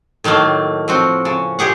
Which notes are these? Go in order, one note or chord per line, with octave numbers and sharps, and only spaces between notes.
A2 D#3 F#3 A3 A#3
F3 C4 F#4
C#3
A#2 G4 G#4 F#5